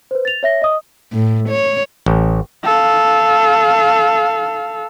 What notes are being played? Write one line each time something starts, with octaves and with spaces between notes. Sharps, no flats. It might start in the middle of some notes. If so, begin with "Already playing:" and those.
B4 C5
A6 F7
C#5 E5 A#6
D#5 D#6
A2
C#5
A1
A4 F5